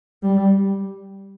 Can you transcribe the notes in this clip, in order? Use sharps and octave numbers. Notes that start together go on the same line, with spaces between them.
G3